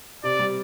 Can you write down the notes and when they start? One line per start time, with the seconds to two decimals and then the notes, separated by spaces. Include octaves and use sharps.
0.23 C3 D5
0.39 G3